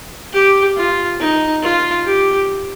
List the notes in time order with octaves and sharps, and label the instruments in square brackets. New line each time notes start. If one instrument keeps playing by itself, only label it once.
[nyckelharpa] G4
F4
D#4
F4
G4